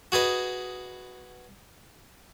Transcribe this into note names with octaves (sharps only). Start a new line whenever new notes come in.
F#4 G#4 B4 D#5